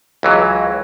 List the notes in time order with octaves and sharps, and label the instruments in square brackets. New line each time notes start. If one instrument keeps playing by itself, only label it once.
[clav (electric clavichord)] C#2 E3 F#3